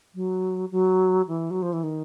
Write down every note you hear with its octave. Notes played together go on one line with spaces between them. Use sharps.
F#3
F#3
E3
F#3
F3
E3
D#3